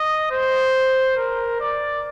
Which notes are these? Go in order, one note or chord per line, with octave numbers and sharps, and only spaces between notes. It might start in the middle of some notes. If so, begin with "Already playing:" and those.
Already playing: D#5
C5
A#4
D5